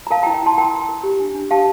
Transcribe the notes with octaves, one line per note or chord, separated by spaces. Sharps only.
A#5
A#4 F5 A5
G5 A#5
E4
G5 A#5
E4 A5 C6
A#4 G5 A#5
A#4
A#4
G4
D4
D4
G4 F5 A5